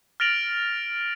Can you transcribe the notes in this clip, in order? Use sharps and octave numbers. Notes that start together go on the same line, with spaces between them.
F6 A6 A#6 D7 F7 F#7